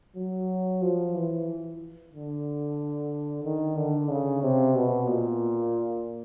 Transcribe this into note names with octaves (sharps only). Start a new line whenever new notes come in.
F#3
F3
E3
D3
D#3
D3
C#3
C3
B2
A#2